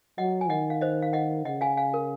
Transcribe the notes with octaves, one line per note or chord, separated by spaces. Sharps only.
F#3 D#5 F#5
G#5
D#3 D#5 F#5
F5
C5 D#5
F5
D#5 F#5
C#3 D#5 F#5
F5 G#5
F5 G#5
A#4